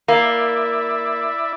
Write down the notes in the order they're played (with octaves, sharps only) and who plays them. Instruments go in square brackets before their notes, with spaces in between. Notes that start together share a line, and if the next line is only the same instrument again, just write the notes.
[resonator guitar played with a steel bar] A#3 [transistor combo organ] E4 D5 E5